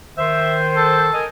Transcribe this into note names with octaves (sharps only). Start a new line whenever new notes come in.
D#3 C5 E5
A4
A#4 D#5 G#5